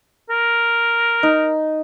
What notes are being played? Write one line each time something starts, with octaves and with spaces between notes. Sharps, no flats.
A#4
D#4